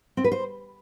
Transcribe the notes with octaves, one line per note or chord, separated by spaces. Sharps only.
C4
B4
C5